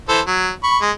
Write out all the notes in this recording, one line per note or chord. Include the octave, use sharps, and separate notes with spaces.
E3 A4 C5
F#3
B5 C#6
G#3